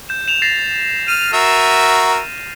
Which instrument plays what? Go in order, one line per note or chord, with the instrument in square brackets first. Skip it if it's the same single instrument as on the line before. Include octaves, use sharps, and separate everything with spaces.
[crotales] G6 E7
E7 F7
A6 A#6 C7
[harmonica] F6 [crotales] D#7
[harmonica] F#4 A#4 E5 [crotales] F6